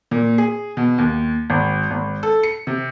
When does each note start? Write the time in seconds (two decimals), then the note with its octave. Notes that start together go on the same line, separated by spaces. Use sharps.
0.11 A#2
0.38 G#4
0.77 B2
0.98 D#2
1.50 G#1
1.91 G#1
2.23 A4
2.43 C#7
2.67 C3